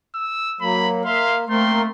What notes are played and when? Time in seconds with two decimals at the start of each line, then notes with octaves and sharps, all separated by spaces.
0.15 E6
0.61 F#3 A#3 B5
1.05 A#3 E5 F5 C6
1.49 A3 A#3 C4 A#4 C6